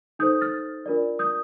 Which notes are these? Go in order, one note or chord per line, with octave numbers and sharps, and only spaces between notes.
D#4 A4 C5 D#6 G6
F6 A6
D4 F4 A#4 D5
D#6 G6